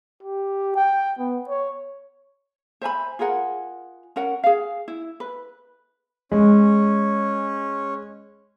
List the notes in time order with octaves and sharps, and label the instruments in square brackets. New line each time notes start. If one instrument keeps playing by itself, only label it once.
[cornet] G4
G5
B3
C#5
[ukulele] C5 E5 G#5 B5
F4 G#4 A#4 F#5
C#4 A#4 F#5
G#4 F5
E4
B4
[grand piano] G#3 [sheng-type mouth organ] C#4